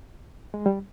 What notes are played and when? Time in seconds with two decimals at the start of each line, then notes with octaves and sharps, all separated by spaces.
0.54 G#3
0.66 G3